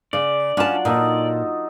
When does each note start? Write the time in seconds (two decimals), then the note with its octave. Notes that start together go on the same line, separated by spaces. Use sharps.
0.13 C#3 D5
0.57 F#3 C#4 D4 F4 A5
0.85 A#2 D#4 A4 D#5